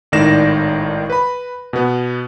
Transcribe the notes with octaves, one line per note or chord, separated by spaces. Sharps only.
G#1 A2 D#3 D5 A#6 E7
B4 B5
B2 B3